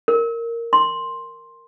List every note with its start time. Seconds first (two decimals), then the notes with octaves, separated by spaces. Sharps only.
0.08 A#4
0.73 C6